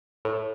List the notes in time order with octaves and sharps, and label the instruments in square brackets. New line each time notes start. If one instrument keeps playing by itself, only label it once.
[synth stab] A2